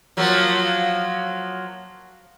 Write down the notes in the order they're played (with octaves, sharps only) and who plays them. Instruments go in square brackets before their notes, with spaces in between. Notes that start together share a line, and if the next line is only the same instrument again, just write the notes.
[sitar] F3 F#3 A#3